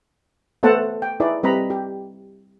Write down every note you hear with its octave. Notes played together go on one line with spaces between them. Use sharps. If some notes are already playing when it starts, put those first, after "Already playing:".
A3 B3 A4 C5 F#5 A5
G5
D#4 E4 G#4 B4 D5
G3 C4 B4 D#5 A#5 B5
G4